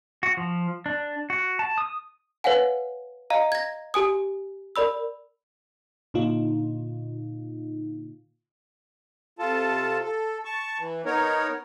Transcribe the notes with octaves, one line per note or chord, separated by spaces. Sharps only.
F#4
F3
D4
F#4
A5
D#6
B4 C#5 F5 F#5 G#5
D#5 F5 A#5
G#6 A#6
G4 G#5 D#6
A#4 D5 B5 E6
A#2 D3 D#4 F4
C3 F4 A4 A5
A4
A5 C#6
E3
B3 D#4 A#4 C#5